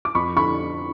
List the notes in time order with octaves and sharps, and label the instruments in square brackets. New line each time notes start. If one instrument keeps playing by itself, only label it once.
[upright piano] D6
F2 B5 C#6
D3 B5 C#6